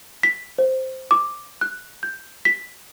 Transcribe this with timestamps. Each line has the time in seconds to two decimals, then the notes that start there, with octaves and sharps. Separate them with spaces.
0.23 B6
0.58 C5
1.11 D6
1.61 F#6
2.03 G6
2.45 B6